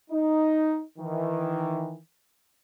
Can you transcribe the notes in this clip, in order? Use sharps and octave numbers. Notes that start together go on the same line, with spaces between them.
D#4
D#3 E3